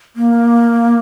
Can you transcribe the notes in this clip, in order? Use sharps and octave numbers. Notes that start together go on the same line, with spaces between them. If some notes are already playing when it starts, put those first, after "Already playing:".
A#3